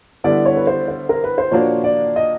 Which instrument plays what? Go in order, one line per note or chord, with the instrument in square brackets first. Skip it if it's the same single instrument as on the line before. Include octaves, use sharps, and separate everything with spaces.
[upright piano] D3 G3 B3 E4 [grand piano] D5
[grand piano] C#5
B4
C5
C5
A#4
B4
C5
[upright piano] A#2 F3 A#3 D4 F#4 [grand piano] C#5
[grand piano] D5
D#5